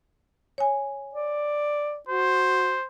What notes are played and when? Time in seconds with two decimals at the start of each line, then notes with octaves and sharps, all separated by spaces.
0.58 C#5 G#5
1.14 D5
2.09 F#4 C5